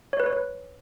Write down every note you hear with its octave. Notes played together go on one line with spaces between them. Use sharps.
C#5
B4
C#5
B4